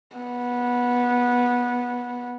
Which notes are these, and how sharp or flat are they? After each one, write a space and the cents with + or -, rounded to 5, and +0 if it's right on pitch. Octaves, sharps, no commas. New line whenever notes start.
B3 -15